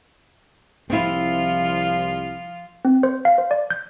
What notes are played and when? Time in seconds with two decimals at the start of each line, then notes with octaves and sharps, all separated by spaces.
0.90 C2 F3 C4 E4 F4
2.85 C4
3.03 C5
3.25 F5
3.38 C5
3.51 D5
3.70 G6